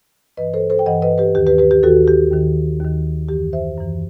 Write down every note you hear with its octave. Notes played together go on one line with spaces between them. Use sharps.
G2 E3 B4 D#5
A4 C5
A4 C5
G5
G2 E3 D#5 F#5
B4 D#5
G4 B4
D#2 D#3 G4
G4 B4
G4 B4
G4
D#2 D#3 F#4 A4
G4
D#2 D#3
D#2 D#3
F#2 E3 G4
C5 E5
F#2 E3